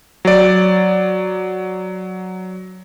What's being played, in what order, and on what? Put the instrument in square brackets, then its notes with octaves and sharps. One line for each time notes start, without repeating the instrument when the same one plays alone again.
[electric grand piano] F#3 D5